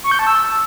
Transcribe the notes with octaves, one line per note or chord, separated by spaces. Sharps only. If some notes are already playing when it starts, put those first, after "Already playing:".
C#6
G6
A5
E6